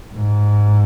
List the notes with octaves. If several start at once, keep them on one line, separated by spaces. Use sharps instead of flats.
G#2